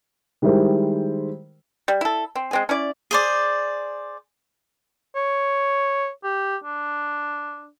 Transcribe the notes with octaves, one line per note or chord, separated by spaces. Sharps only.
D#3 G3 G#3 E4 A#4 C5
G3
E4 A4
C4
G#3 C4 G#4
C#4 E4 D5
G#4 C5 D5
C#5
G4
D4